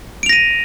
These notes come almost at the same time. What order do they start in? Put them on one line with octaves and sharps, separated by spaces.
D7 F7 A#6 D#7